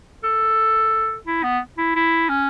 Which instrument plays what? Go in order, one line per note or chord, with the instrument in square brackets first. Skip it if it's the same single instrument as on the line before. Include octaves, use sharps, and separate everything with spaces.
[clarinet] A4
E4
B3
E4
E4
C#4